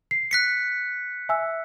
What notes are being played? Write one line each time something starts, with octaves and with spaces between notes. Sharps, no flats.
C7
F#6 B6 C#7
E5 G#5 E6